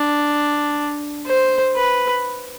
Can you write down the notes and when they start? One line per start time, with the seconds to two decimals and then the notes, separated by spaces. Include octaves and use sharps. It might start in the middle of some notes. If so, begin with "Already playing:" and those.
Already playing: D4
1.27 C5
1.76 B4